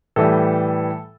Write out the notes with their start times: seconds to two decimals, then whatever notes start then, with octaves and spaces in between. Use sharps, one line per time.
0.16 A2 E3 G3 A4